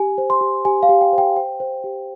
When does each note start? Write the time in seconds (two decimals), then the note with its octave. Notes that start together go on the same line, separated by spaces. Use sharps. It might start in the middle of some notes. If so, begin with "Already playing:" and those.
Already playing: G4 G#5
0.18 C5
0.30 C6
0.41 G4
0.65 G4 G#5
0.83 F5
0.89 G4
1.01 G5
1.13 C5
1.18 G5
1.36 C5 G5
1.60 C5
1.84 G4